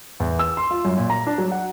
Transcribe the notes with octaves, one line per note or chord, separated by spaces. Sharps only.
E2
E6
C6
F4
F#2
A#2
A#5
D4
F#3
F#5